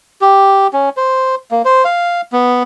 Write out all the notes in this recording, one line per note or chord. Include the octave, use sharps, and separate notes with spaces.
G4
C#4
C5
A#3
C5
F5
B3